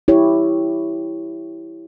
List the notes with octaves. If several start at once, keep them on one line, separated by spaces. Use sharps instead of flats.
E4 G4 C#5